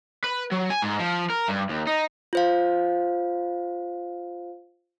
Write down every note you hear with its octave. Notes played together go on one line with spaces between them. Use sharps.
B4
F#3
G#5
G#2
F3
A#4
G2
D#2
D#4
F4 C5 F5